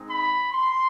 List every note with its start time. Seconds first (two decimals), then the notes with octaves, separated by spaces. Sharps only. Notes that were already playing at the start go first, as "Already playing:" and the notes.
Already playing: G#3 C4 D#4
0.10 B5
0.52 C6